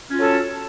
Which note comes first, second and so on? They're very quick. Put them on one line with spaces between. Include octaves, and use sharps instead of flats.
C#4 F4 F#3 A4